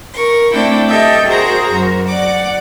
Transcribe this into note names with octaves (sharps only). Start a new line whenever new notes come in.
A#4 C#6
A3 C4 D4 E4 G5
G4 A4 D#5 E5 G5
F#4 G#4 A#4 C5 A#5
F#2 F#4 A#4
D5 F#5 D6